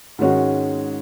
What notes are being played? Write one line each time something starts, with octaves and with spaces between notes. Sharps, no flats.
G#2 D#3 G#3 C#4 F#4